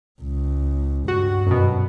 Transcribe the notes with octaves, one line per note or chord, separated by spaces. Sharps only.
C#2
G2 F#4
F#2 B2